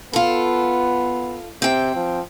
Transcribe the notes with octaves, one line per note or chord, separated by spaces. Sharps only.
B3 F4 A4
C3 C4 G5
F3